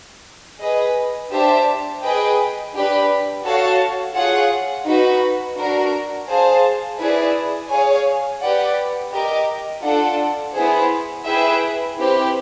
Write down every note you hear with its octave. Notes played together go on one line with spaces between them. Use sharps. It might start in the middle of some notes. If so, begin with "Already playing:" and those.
G#4 B4 D#5
D4 G4 C5 E5 A5
G#4 B4 D#5 G5
D4 G4 B4
F#4 A4 C#5 F5 A5
F4 G#4 C#5 F#5
D#4 F#4 B4
D4 F#4 A#4
G#4 C5 F5 A5
E4 G#4 B4 D5
G#4 C#5 F5 G#5
G4 B4 D5 F#5
G4 A#4 D#5
D4 F4 A4 D5 F#5
B3 E4 G#4 C5
E4 G#4 B4 E5 G5
C4 E4 G4 B4